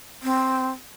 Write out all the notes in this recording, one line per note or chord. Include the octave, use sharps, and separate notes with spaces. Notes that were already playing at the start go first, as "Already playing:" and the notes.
C4